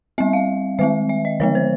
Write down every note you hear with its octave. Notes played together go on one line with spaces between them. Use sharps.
G3 C4 E5
F5
D#3 G#3 C4 E5
E5
D#5
D3 F3 G#3 B3 C#5
C5